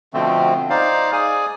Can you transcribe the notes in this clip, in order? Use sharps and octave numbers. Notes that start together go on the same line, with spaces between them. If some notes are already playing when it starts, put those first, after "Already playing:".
B2 D3 F3 A3 C4
D#4 C5 D5 F5
G#4 D5 G#5